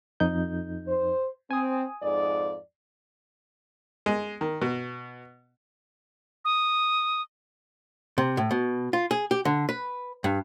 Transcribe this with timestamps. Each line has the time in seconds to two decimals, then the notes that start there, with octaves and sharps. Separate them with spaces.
0.20 F2 D#4 G6
0.87 C5
1.51 C4 G#5 D#6
2.02 F2 G#2 D5
4.06 G#3
4.41 D#3
4.62 B2
6.45 D#6
8.18 C3
8.37 A2
8.51 B2
8.93 F4
9.11 G#4
9.31 G4
9.45 D3
9.69 B4
10.24 G2